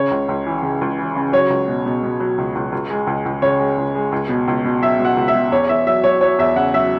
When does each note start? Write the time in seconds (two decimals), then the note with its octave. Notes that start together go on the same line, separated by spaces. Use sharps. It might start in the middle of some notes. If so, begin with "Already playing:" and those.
Already playing: C#3 C#5
0.11 C#2
0.28 C#2
0.46 E3
0.63 C#3
0.81 C#2
0.99 E3
1.16 C#3
1.32 F#3 C#5
1.50 C#2
1.68 B2
1.86 B2
2.03 B2
2.20 F#3
2.38 C#2
2.55 C#2
2.72 C#2
2.90 G#3
3.07 C#2
3.26 C#2
3.42 C#3 C#5
3.59 G#3
3.78 C#2
3.95 G#3
4.12 C#2
4.29 B2
4.48 C#2
4.64 B2
4.81 F#3 E5
4.99 B2
5.05 F#5
5.17 C#2
5.28 E5
5.35 B2
5.52 E2 C#5
5.69 E2 E5
5.87 F#3 E5
6.04 F#3 C#5
6.21 F#3 C#5
6.39 E2 E5
6.56 C#3 F#5
6.74 F#3 E5